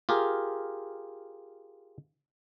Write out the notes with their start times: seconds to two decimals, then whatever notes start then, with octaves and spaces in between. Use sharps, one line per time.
0.09 F4 G4 G#4 A#4